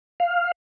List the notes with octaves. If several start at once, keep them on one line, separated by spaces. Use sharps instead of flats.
F5